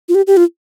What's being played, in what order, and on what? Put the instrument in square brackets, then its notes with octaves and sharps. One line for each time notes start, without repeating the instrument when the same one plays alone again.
[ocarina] F4
G4
G4
F4